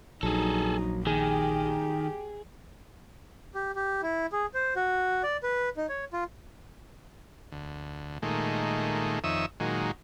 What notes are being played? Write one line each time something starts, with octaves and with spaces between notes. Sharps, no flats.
A#1 F#3 D#4 G#4 A4
D#3 G4 G#4
G4
G4
E4
G#4
C5
F#4
D5
B4
D#4
C#5
F4
D2
A#2 D#3 G#3 A3
F2 D#3 C#5 E5 D#6 E6
A#2 D#3 F#3 G#3